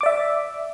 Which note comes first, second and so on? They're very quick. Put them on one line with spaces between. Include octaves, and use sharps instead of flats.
D6 D5 E5